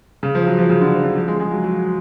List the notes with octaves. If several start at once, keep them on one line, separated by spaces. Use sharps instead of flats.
C#3
F3
F#3
F3
C#3
D3
F3
D3
F3
G#3
G#3
F#3
F#3